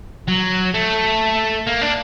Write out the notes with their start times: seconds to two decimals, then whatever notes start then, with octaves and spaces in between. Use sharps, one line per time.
0.28 F#3
0.74 A3
1.67 A#3
1.81 D4